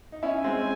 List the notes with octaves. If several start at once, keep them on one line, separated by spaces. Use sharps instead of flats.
D#4
C#4 E4 G#5
G#3 C4